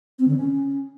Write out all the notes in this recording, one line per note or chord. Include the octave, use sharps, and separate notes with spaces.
C4
D3
C#4